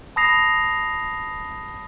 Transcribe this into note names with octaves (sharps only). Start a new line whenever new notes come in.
A5 B5 D#6 A#6 C7 F7